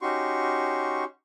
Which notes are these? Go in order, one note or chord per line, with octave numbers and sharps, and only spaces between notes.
C#4 D#4 F#4 G4 C6 C#6